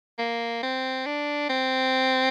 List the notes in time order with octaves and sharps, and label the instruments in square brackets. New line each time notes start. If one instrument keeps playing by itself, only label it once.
[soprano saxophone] A#3
C4
D4
C4